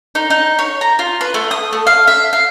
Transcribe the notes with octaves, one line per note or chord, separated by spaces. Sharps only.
D#4
D#4
C#5
A#5
F4
B4
A3
D#6
A3
F5
E5
F5